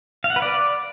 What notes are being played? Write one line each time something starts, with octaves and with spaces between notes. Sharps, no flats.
F5
F#5
B4
D5